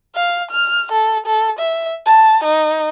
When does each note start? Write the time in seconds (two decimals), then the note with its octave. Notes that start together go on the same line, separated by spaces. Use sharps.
0.16 F5
0.51 F6
0.92 A4
1.27 A4
1.59 E5
2.06 A5
2.44 D#4